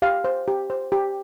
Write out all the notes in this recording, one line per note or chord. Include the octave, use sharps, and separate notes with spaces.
G4 F5
C5
G4
C5
G4